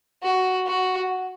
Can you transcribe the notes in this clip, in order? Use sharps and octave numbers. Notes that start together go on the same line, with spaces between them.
F#4
F#4